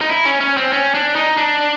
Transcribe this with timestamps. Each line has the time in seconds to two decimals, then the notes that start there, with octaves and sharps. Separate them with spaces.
0.01 D#4
0.09 E4
0.25 C#4
0.41 C#4
0.57 C4
0.73 C#4
0.94 D4
1.15 D#4
1.37 D4